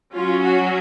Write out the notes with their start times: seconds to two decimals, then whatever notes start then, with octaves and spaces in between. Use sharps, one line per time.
0.13 F#3 C#4 F4
0.43 F#4